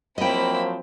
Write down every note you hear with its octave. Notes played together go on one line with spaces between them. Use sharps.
F3 F#3 A#3 C4 E4 D#5 G5 B5